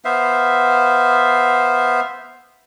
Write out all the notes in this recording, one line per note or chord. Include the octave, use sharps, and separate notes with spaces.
B3 C5 E5 F5